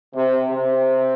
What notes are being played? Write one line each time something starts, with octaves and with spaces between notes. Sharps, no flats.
C3
C3